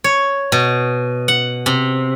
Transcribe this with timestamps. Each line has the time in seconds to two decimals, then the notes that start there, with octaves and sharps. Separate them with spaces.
0.04 C#5
0.52 B2
1.28 F#5
1.66 C3